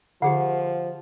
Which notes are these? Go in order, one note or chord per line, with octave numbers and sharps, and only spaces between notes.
D3 F3 G4 G#4 F#5